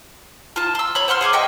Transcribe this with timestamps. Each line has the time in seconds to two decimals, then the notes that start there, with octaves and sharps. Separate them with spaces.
0.56 F4 A5
0.75 C6 E6
0.95 C#5 B5
1.08 C5 F#5 C6 F6
1.21 G#4 F#5 G#5 D6
1.33 D#5 E5 G5 C#6